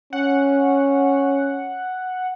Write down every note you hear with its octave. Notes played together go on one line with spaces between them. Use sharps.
C#4 F#5